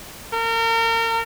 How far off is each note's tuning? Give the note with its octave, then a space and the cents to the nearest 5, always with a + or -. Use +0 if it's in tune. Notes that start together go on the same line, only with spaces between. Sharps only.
A#4 -35